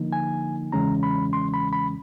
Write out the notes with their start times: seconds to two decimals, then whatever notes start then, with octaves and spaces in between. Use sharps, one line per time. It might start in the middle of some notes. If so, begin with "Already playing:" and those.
Already playing: D3 F3 A#3 D#4
0.13 G#5
0.72 E2 C#3 E3 G#3 C#4 A#5
1.03 B5
1.33 C6
1.54 B5
1.73 B5